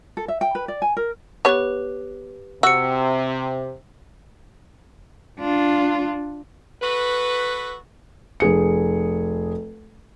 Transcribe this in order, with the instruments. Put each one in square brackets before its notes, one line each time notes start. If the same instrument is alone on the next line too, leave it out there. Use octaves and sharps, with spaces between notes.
[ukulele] A4
E5
G5
B4
D5
G#5
A#4
[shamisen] B3 C#5 [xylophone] G4 B4
[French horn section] C3 [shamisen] F#4 [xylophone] E6 C#7
[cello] D4 F4
[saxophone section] F#4 A4 B4
[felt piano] F1 G#4 C#7